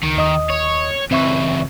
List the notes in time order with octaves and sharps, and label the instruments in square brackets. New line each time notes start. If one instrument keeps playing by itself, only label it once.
[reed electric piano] C#2 [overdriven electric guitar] D#3
[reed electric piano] D#2 D#5 D#6
[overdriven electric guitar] C#5
[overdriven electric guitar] C#2 E3 [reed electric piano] C4 E5 C#6